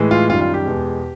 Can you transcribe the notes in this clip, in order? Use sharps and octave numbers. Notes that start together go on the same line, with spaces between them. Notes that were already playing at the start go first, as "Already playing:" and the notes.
Already playing: A2 E3 G#3
F4
F#2 D#3 G3 F4
F4
G4
E2 B2 G#3